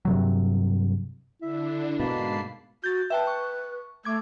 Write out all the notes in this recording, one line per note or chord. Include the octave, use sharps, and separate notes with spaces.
G2 C3 F#3
D3 D4 E4 E5
G#2 B2 A#3 A5 B5 C7
F#4 G6 A6
B4 E5 G5 A5
C#6
A3 D6 G#6